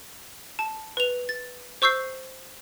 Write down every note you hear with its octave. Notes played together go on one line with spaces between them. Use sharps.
A5
B4 F7
A6
C5 C#6 E6 G6 C7